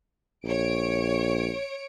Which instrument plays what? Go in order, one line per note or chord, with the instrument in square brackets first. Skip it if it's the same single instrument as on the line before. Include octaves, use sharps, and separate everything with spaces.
[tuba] A#1 [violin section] C#5 D7